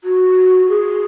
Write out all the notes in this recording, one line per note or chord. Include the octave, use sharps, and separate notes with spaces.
F#4
G#4